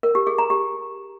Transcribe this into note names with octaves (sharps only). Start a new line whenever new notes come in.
A#4
G4
G#4
A#5
G4